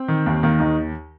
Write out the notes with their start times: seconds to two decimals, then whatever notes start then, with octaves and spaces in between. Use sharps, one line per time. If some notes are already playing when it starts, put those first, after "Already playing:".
Already playing: C4
0.08 D#3
0.26 D#2
0.43 D#3 A#3
0.59 D#2 D#4